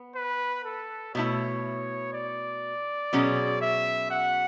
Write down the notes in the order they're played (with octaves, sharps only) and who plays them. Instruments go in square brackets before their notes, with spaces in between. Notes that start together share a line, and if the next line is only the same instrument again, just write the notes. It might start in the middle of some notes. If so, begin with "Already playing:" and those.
Already playing: [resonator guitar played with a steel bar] B3
[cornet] B4
A4
[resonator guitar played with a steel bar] B2 A3 E4 [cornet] C#5
[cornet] D5
[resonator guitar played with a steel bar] B2 F#3 C#4 G#4
[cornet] E5
F#5